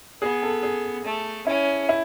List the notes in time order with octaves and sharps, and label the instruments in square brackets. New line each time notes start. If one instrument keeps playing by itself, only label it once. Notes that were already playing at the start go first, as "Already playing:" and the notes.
[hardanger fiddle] B3 [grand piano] G#4
[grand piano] A4
G#4
[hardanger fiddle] A3
[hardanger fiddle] C#4 [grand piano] E4
[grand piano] E4